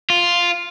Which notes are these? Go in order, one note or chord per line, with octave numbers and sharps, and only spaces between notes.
F4